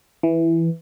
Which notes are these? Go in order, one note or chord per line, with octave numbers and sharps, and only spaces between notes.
E3